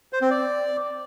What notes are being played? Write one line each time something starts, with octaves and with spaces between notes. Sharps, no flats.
C5
C4
D5